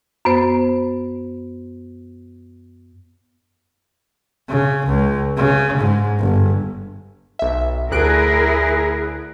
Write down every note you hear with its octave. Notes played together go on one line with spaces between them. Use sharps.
F#2 B3 C5
C#3
C#2
C#3
G#2
G1
B1 E5
D2 E4 G#4 A#4 F#6 D7